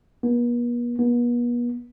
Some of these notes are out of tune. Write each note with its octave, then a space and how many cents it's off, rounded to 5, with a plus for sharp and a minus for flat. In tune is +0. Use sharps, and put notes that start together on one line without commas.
B3 -45
B3 -40